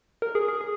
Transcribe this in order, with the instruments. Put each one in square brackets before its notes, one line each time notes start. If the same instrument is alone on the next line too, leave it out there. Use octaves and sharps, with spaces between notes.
[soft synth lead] A#4
G#4
G#4
G#4